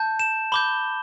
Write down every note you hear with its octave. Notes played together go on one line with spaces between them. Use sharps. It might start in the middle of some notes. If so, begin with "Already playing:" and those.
Already playing: A5 G6
E7
B5 D6 G6 G7